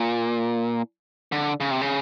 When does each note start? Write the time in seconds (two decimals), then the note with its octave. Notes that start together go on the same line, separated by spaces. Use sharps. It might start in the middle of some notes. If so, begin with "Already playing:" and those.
Already playing: A#2
1.32 D3
1.60 C#3
1.71 C3
1.81 C#3